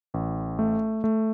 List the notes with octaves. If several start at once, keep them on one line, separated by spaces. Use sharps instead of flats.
A1
A3
A3